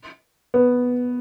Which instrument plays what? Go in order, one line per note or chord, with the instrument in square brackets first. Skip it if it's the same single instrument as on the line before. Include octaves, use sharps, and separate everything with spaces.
[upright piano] B3